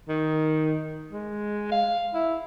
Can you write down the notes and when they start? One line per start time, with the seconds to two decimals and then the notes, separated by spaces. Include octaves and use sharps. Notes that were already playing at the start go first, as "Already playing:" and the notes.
0.09 D#3
1.12 G#3
1.72 F5
2.14 E4